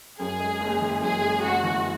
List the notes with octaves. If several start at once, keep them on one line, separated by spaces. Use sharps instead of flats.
F#2 G#4
G#3
F#1
E3
F#2 G#4
G#3
F#1 F#4
E3